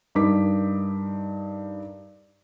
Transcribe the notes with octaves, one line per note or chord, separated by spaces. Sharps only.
G2 D#4 A#4 D6 B6